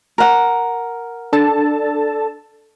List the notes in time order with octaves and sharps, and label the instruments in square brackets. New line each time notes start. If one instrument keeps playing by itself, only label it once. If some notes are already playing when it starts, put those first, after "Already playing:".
[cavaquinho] A#4 F#5
[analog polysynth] D4 A4 A5